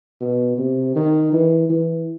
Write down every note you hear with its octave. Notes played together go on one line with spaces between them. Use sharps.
B2
C3
D#3
E3
E3